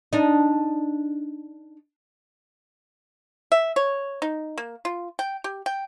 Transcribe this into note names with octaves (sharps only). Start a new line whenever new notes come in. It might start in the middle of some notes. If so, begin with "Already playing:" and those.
D4 D#4
E5
C#5
D#4
A#3
F4
G5
G4
G5